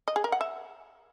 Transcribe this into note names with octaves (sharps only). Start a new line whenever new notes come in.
D#5
G#4
A#4
F#5
E5